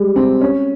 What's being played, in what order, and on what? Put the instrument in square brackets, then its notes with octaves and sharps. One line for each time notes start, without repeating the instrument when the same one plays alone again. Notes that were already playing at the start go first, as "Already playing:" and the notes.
Already playing: [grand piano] G3 G#3
C4
C#4